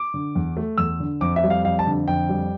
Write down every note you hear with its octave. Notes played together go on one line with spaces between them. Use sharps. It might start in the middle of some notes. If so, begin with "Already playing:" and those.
Already playing: D6
D3
E2
A3
E2 E6
D3
F2 D6
E5
G3
F5
F2 F5
A5
D3
F2 G5
G3